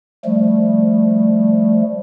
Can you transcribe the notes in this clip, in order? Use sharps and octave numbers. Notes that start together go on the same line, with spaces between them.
F3 G3 A3